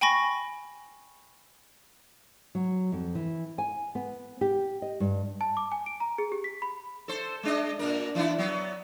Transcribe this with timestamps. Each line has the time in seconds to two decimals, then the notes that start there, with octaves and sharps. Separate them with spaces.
0.01 G5 G#5 B5 C#6 A#6
2.55 F#3
2.92 F2
3.15 E3
3.58 G#5
3.95 B3
4.41 G4
4.82 D#5
5.00 G2
5.41 A5
5.57 D6
5.72 G#5
5.86 D7
6.00 A#5
6.18 G#4
6.32 G4
6.44 B6
6.62 B5
7.08 A4 C5
7.43 G#3 D4 D#5
7.79 A#2 D4 A#4
8.15 E3 D4 E4
8.38 F#3 B3